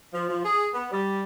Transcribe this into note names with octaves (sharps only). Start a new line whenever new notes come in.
F3
F3
G#4
B3
G3